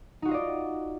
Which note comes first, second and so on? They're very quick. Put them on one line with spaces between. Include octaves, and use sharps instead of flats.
D#4 F#4 F4 D#5 D5